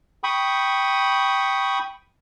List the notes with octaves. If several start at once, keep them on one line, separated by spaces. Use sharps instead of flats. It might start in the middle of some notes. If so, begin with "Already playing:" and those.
G5 B5 C#6 D#6